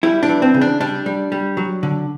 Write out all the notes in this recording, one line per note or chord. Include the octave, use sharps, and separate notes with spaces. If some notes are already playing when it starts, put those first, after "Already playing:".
G3 E4
D4
E3
C4
C#3
D4
G3 D4
G3
G3
F#3
D3